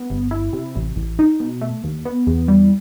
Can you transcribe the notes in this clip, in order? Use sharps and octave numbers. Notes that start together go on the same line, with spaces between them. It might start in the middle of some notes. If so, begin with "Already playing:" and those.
Already playing: B3
G1
E4
C3
A1
A1
D#4
B2
A3
D#2
B3
E2
G3